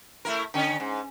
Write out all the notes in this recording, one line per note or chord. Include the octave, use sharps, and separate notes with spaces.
A3 E4 A#4
D3 C#4
G#2